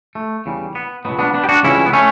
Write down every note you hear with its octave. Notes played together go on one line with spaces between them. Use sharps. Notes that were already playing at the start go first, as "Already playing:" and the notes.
A3
E2 C#3 G3
B3
C#2 B2 F#3 B3
B3 D4
B3 D4
G4
D4 F#4
C#2 C#3 E3 G3 C#4 E4
B3
A3 C#4